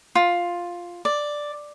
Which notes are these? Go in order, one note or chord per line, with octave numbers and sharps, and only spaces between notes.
F4
D5